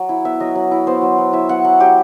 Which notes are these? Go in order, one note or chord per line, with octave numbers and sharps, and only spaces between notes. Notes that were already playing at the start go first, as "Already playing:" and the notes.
Already playing: F#3 F#5
E4
B3 E5
F#3 D#5
F#3
E4
B3 C5
F#3
F#3
E4 E5
B3 F#5
F#3 F#5
F#3 G4